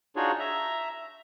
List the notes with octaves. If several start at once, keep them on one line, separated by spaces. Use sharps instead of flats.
D4 D#4 F4 F#4 G#4 C#5
E5 A#5